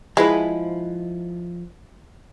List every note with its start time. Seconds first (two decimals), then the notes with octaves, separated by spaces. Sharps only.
0.17 F3 G#3 E4 B4